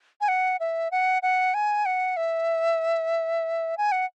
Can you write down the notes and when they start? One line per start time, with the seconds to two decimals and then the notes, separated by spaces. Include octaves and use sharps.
0.21 G#5
0.28 F#5
0.60 E5
0.91 F#5
1.22 F#5
1.54 G#5
1.85 F#5
2.17 E5
3.77 G#5
3.92 F#5